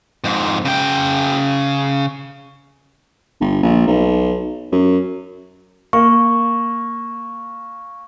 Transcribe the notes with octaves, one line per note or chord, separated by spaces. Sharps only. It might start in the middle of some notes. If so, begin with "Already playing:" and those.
F2 G#2
C#3 G5
G1
A#1
B1
F#2
A#3 C#6